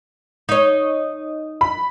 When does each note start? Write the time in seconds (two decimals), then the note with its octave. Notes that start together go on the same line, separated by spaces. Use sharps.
0.49 D#4 C#5
1.61 B5